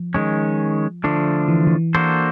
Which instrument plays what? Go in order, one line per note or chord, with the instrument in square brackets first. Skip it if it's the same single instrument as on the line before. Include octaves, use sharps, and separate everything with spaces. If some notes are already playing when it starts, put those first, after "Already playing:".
Already playing: [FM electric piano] F3
[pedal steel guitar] D#3 G#3 C#4
D3 F3 A3 D4
[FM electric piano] E3
E3
[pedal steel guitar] A#3 D4 F#4 A4 C5